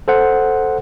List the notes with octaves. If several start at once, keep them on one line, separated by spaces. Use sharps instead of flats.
A4 C5 F#5